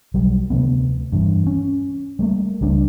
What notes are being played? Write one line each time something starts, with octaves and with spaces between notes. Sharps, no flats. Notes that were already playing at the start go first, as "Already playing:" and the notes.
B1 F#3 G3
D2 C3 F3 B3
G2 E3
C#4
G3 A3 A#3
C#2 G3 D4